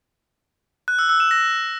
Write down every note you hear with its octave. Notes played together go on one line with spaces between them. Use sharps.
F#6
E6
E6
E7
A#6